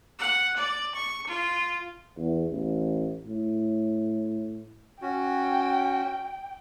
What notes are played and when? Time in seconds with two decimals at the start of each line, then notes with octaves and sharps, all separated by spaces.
0.19 F#5
0.57 D5
0.96 C#6
1.28 F4
2.17 E2
2.50 A1
3.26 A2
5.02 C#4 F#4 G5